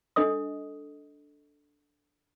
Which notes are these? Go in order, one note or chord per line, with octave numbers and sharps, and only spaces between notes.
D4 A4 D#5 D#6